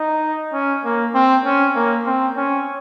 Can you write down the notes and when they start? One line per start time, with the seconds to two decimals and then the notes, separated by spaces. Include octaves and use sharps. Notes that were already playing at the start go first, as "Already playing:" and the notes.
Already playing: D#4
0.53 C#4
0.84 A#3
1.14 C4
1.45 C#4
1.75 A#3
2.06 C4
2.37 C#4